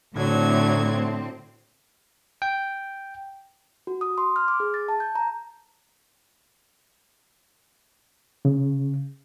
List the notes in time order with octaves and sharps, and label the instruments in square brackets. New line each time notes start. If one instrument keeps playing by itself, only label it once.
[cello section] A2 C4 [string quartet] D3 F#3 G#6
[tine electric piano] G5
[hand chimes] F#4
D#6
C6
F6
D6
G#4
A6
A5
G6
A#5
[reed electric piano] C#3